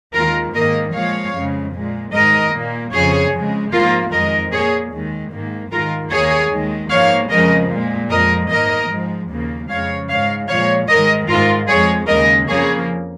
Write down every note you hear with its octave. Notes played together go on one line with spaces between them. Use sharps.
D#2 D#3 G#3 F4 A#4
G#2 D#3 A#3 A#4 D#5
A#2 F3 G#3 C#5 F5
F2 C#3 G#3
A#2 G#3
G#2 D#3 G#3 A#4 D#5
A#2 A#3
F2 C#3 F3 G#4 C#5
F2 C#3 G#3
G#2 F3 A#3 F4 A#4
F2 D#3 G#3 A#4 D#5
A#2 A#3 G#4 C#5
D#2 D#3 G#3
G#2 D#3 A#3
G#2 D#3 G#3 F4 A#4
D#2 D#3 A#3 G#4 C#5
D#2 D#3 G#3
G#2 F3 A#3 C#5 F5
F2 C#3 F3 G#3 A#4 D#5
A#2 G#3
F2 F3 G#3 A#4 D#5
G#2 D#3 A#3 A#4 D#5
G#2 F3 G#3
D#2 C#3 F3 A#3
F2 C#3 G#3 C#5 F5
G#2 G#3 C#5 F5
A#2 F3 G#3 C#5 F5
G#2 D#3 G#3 A#4 D#5
G#2 G#3 F4 A#4
F2 F3 G#3 G#4 C#5
D#2 C#3 G#3 A#4 D#5
F2 C#3 F3 A#3 G#4 C#5